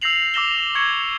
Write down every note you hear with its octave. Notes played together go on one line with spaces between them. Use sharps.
E6 G6 A#6 C7 F7 F#7
D6 E6 A#6 E7 G7
C#6 G#6 C#7